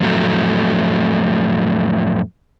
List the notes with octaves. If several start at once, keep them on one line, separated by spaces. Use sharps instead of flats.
F2 A2 F#3 A3